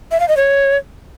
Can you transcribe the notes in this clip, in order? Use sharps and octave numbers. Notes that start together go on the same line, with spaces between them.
E5
F5
D#5
C#5